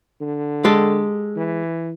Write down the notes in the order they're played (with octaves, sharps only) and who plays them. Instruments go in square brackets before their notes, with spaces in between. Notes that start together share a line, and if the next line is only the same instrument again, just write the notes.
[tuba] D3
[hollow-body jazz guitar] G#3 G4 A4
[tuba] E3